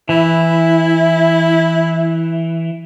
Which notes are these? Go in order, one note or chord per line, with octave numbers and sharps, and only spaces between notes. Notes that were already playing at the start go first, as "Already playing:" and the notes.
E3 E4